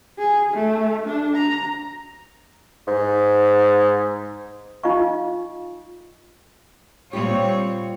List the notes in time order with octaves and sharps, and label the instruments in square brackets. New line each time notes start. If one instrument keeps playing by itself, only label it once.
[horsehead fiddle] G#4
A3
D4
A#5
[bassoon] G#2
[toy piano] D#4 F4 D#5 F5 C#6
[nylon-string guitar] A#2 F4 G4 [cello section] G3 C4 C#5